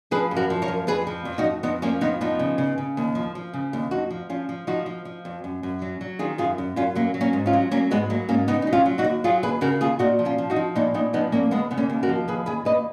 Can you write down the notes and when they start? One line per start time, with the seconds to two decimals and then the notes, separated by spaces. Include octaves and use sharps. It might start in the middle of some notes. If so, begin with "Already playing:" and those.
0.11 F3 G#4 B4
0.31 F#2
0.36 F#4 A#4
0.50 F3
0.62 A#4 C#5
0.68 F#2
0.87 F2 G#4 B4
1.07 F3
1.25 F2
1.38 D#4 F#4
1.44 F2
1.63 F2 B3 D#4
1.82 F3 A#3 C#4
2.01 F2 B3 D#4
2.21 F3 B3 D#4
2.39 C#3
2.58 C#3
2.78 C#3
2.97 D#2
3.15 F3
3.35 F3
3.53 C#3
3.73 D#2
3.91 F2 D#4 F#4
4.10 F3
4.29 F3 C#4 F4
4.49 F3
4.67 F3 D#4 F#4
4.86 F3
5.05 F3
5.25 F2
5.44 F#2
5.63 F#2
5.82 F#3
6.01 F#3
6.19 D#3 F4 G#4
6.38 F#2 F4 G#4
6.58 F#2
6.76 F#2 C#4 F4
6.95 F#3 A#3
7.14 F#3
7.21 A#3 C#4
7.33 G#2
7.46 C#4 F4
7.53 F#3
7.71 F#3 A#3 C#4
7.91 G#2 G#3 B3
8.10 F#3 A#3
8.29 G#2 A#3 C#4
8.48 C#3 B3 D#4
8.62 F#3 D#4
8.73 C#4 F4
8.86 F#3
8.98 D#4 F#4
9.04 D#2
9.24 F#3 F4 G#4
9.43 D#2 G#4 B4
9.61 C#3 F#4 A#4
9.81 D#2 F4 G#4
9.99 A#2 D#4 F#4
10.19 F3
10.25 C#4 F4
10.38 F3
10.50 D#4 F#4
10.56 F3
10.75 A#2 B3 D#4
10.94 A#2 B3 D#4
11.13 F3 B3 D#4
11.32 A#2 A#3 C#4
11.51 D#2 G#3 B3
11.71 C#3 B3
11.78 A#3 C#4
11.90 D#2
12.03 F#4 A#4
12.09 F3
12.28 D#2 G#4 B4
12.46 D#2 G#4 B4
12.65 D#2 B4 D#5